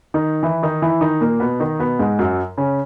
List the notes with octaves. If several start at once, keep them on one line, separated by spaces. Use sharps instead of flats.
D#3 D#4
E3 E4
D#3 D#4
E3 E4
D#3 D#4
A#2 A#3
B2 B3
D#3 D#4
B2 B3
G#2 G#3
F#2 F#3
C#3 C#4